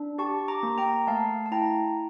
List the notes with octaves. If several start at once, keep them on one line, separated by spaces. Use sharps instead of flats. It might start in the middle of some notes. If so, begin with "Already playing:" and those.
Already playing: D4
G4 A5 C#6
A#5 D6
A#3
G5 A#5
A3 F5 A5
A5
E4 G5 A#5